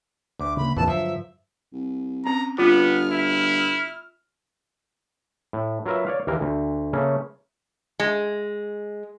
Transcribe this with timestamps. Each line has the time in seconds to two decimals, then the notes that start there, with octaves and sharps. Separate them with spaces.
0.39 D2 D6
0.57 C#3 A#3 B5
0.76 A#1 E2 C3 E3 F3 A5
0.88 G2 D3 F3 F#3 E5
1.73 C2
2.25 C4 C#4 A#5
2.58 G1 B3 F4 F6
3.11 E4
5.53 A2
5.86 F#3 F4 A#4 B4 E5
6.07 C#5 D5 F5
6.27 D#2 E3 A#3 A#4
6.41 D2
6.93 C#3 A3 A#3 C#4
8.00 G#3